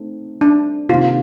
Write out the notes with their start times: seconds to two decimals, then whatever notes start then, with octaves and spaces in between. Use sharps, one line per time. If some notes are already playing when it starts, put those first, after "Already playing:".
Already playing: A3 C4 D#4
0.41 D4
0.89 C3 D#3 A#3 F4